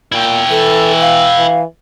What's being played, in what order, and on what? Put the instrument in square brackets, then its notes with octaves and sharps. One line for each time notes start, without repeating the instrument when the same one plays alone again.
[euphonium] A#2 [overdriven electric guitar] E4 G5
[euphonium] E3 [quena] A4
[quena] F5
[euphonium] E3